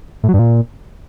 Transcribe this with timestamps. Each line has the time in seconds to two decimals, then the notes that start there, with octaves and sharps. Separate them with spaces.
0.23 A2
0.29 F#3
0.34 G2
0.39 A#2